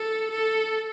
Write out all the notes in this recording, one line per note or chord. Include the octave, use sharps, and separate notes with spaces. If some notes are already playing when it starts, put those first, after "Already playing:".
Already playing: A4
A4